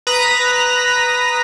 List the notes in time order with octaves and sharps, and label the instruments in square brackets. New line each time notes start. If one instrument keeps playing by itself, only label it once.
[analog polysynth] B4 A#5 D#6 A#6 B6